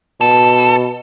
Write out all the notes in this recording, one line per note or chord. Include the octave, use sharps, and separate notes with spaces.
B2 A4